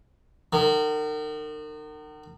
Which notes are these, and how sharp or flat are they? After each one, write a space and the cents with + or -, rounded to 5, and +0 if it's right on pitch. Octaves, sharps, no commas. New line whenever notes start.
D#3 -40